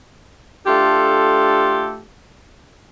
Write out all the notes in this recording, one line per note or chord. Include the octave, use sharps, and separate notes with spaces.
A3 D4 F4 G4 A4